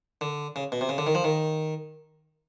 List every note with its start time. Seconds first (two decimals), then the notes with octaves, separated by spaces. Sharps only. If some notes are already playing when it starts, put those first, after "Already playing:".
0.21 D3
0.56 C#3
0.72 B2
0.81 C3
0.89 C#3
0.98 D3
1.07 D#3
1.15 F3
1.24 D#3